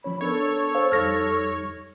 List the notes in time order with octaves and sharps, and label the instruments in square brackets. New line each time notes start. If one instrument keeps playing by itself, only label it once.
[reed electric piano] F3 C#4 C#5 [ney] B5
[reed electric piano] B3 D4 A#4 [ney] A4 [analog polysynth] C#5
[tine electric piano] C5 F5
[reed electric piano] F2 G3 D#4 [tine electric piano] F6 A#6